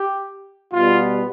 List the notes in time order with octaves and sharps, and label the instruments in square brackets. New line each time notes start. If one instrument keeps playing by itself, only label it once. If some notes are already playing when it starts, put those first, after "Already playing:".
Already playing: [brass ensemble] G4
B2 G3 B3 F4